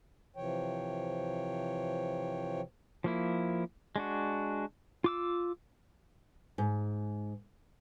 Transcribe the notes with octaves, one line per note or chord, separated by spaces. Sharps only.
C3 E3 F3 C#5 G5
F3 A#3 E4
G#3 D4 F#4
F4 D6 E6
G#2